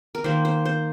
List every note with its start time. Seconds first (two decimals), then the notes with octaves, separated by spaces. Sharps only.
0.15 A#4
0.24 D#3 A#3 C5
0.45 C5
0.65 C5